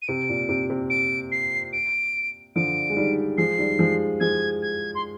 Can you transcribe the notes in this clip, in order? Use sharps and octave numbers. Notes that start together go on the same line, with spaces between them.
D#7
C3 D7
A#2
C3
C3
D7
C7
D7
D3 F3 D7
G#3
D#3 G3
F3 G#3 C7
D#3 G3
F3 G#3
F3 G#3 G#6
G#6
C6